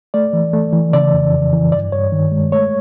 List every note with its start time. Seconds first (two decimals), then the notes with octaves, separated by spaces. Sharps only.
0.14 A3 D5
0.33 E3
0.53 A3
0.73 E3
0.93 C#3 D5
1.13 F2
1.33 F2
1.53 E3
1.72 G2 D5
1.92 G2 C#5
2.12 D#3
2.32 G#3
2.52 A3 C#5